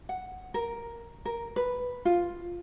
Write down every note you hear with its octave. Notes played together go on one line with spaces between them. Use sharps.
F#5
A#4
A#4
B4
F4